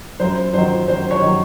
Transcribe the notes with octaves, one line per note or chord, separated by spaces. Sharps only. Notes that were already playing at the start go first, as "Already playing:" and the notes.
F#2 C5
D#3 F#3 C5
F#2 C5
C#5
D#3 F#3